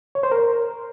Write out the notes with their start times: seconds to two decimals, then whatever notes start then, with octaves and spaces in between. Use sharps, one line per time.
0.15 C#5
0.23 C5
0.32 A#4